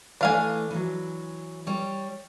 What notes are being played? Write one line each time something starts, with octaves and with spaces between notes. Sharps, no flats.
E3 A3 D4 F5 G#5
E3 F#3
G3 C#5